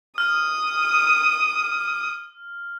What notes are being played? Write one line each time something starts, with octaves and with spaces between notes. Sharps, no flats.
D#6 F6